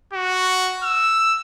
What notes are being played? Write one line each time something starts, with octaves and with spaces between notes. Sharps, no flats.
F#4
E6